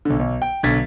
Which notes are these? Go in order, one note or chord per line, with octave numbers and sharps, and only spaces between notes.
B1 D3
B1
G5
B1 D3 G#6 A6 B6